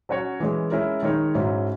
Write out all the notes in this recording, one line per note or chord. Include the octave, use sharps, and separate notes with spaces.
F#3 C#4 F#4 C#5
E3 G#3 C#4
G#3 C#4 E4 A#4
D#3 G#3 D#4 A#4 C#5
G#2 F#3 C#4 E4